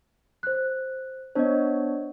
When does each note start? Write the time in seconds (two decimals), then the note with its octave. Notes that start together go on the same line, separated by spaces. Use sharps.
0.43 C5 F#6
1.35 B3 D4 C5 C#5 D#5